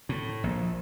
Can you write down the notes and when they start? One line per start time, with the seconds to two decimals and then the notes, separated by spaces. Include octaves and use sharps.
0.09 A2
0.44 A#1